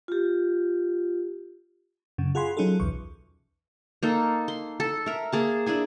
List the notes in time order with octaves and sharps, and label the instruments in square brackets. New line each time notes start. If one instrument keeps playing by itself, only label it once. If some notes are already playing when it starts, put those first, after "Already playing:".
[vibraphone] F4 G4
[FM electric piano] F#2 C#3
F4 G#4 F#5 G#5 B5 C6
F#3 C#4 D#4 F4 G#4 A4
B1 E2 C#6
[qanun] A#3 D#4 A4
C6
A4
A#4 E5
A#3 G#4 A5
D4 E4 G#4 G#5